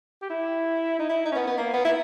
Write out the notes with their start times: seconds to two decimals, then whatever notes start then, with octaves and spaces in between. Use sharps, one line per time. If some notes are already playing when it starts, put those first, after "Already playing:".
0.22 G4
0.30 E4
0.99 D#4
1.09 E4
1.25 D#4
1.32 C#4
1.36 B3
1.47 B3
1.58 A#3
1.73 B3
1.85 E4